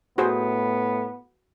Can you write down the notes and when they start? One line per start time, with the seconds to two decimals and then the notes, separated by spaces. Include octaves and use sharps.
0.18 A2 B3 F#4 G#4 C5